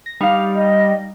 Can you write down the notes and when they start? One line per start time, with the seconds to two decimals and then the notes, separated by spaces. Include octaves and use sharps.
0.06 A#6
0.21 G3 D#4 F5
0.55 D#5